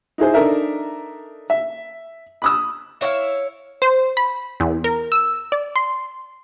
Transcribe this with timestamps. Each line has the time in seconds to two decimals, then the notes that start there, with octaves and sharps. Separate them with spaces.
0.18 D#4 E4 G#4 C5
0.34 D4 D#4 A4 A#4 E5
1.50 E5
2.42 B5 D#6 E6
3.01 E4 C#5 E5 F5
3.82 C5
4.17 B5
4.60 E2
4.84 A#4
5.12 E6
5.52 D5
5.76 C6